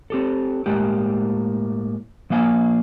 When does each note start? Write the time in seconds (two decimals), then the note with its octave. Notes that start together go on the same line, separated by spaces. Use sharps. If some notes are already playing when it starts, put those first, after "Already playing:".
0.10 C4 G4 A4
0.66 A2 G#3 A#3 G4
2.30 F3 A#3 F5 G#5